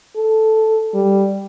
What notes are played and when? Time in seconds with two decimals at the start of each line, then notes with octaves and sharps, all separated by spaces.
0.16 A4
0.94 G3